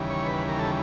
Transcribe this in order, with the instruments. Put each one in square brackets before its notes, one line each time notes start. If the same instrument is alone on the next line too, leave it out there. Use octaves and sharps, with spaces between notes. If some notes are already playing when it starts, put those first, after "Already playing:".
Already playing: [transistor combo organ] D#2 C#3 E3 G3
C#5
B4
A#4
A4